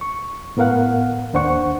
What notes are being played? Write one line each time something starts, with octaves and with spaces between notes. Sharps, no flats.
C#6
A2 B3 A#4 F5 F#5
D#2 D4 C5 F#5 C#6